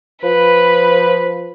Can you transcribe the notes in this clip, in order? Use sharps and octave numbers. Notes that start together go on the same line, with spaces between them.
F3 B4